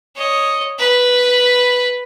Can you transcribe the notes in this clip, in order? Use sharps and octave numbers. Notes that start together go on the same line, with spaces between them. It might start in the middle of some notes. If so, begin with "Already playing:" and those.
C#5 D#5
B4 B5